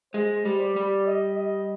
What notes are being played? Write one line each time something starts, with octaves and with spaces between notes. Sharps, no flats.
G#3 C5
G3
D5
G3
D#5
D#5